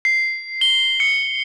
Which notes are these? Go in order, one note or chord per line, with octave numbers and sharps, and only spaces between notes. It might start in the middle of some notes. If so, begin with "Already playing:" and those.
C7
G7
C#7